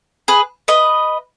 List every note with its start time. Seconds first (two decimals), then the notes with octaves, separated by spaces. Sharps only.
0.28 G#4 B4
0.68 B4 D#5